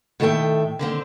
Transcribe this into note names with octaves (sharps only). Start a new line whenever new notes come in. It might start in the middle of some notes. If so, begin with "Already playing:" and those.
A2 D#3 A4 C#5 E5 G5
D3 D#3 C4